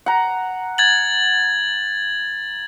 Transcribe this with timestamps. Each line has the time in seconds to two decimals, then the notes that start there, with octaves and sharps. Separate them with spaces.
0.06 F#5 A#5
0.78 G#6 A6 F#7